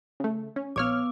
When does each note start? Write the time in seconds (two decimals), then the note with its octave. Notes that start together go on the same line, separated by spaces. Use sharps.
0.20 C#3 A3
0.56 C#4
0.76 A#1 B3 C#5 D6 F6